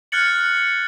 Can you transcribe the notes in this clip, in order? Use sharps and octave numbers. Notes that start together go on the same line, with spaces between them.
F6 F#6 G#6 A6 C#7 F#7